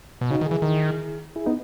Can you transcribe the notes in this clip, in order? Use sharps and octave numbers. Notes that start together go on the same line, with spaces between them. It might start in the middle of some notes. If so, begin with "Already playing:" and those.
B2
C#3 D#4 F#4
D#3
E4 G#4
E3
D#3
E4 G#4
B3 D#4